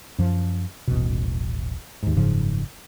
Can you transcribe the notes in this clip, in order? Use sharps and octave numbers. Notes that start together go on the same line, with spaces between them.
F#2 F3
D#1 A1 B2
D#2 G#2
F#1 G#2 C#3 F3